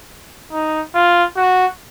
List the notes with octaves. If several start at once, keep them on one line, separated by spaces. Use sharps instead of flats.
D#4
F4
F#4